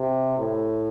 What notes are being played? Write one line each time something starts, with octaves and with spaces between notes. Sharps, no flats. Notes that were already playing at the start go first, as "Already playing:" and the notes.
Already playing: C3
A2